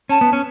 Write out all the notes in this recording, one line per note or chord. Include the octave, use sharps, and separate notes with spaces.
C#4 A5
B3
C#4